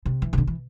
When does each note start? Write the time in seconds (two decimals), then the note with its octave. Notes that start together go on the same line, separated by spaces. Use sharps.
0.06 C3
0.22 E3
0.33 C3
0.38 D3
0.47 E3